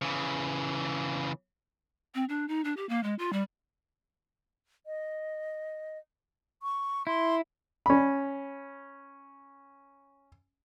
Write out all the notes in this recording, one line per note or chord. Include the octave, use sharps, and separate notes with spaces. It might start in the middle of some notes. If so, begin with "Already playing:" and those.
C#3 E3
C4
D4
D#4
D4
G4
A#3
G#3
F4
G3
D#5
C#6
E4 C6
C#4 B5